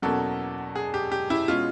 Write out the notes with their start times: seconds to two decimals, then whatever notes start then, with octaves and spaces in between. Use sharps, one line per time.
0.02 E2 B2 F#3 A#3 C#4 A4
0.76 G#4
0.94 G4
1.12 G4
1.30 E4
1.48 B2 G#3 C#4 F4